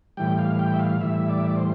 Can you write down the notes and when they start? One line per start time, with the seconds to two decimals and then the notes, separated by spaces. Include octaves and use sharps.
0.17 A2 E3 G3 G5
0.39 F5
0.59 G5
0.74 E5
0.80 F5
1.01 A2 E3 G3 E5
1.29 D5
1.38 E5
1.47 D5
1.56 C5